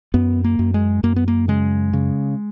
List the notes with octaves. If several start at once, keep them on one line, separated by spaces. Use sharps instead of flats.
F#2 B3
A#3
F#2
G#3
F#2 A#3
B3
A#3
C#3 G#3
C#3